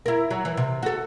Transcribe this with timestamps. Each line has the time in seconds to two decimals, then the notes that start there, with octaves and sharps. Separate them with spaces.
0.06 E4 A#4
0.31 F#3
0.45 E3
0.57 C3
0.83 F#4 A4